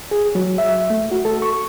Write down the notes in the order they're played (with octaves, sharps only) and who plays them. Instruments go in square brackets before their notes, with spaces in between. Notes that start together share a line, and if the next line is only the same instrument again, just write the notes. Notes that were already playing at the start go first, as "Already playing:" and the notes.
[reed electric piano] G#4
F#3
E5
A3
F#4
A4
C#6